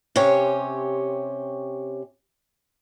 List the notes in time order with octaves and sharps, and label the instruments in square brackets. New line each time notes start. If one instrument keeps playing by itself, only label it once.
[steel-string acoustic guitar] C3 C#4 G4 C#5